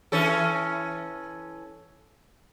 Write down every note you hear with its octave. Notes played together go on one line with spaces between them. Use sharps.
E3 C#4 A4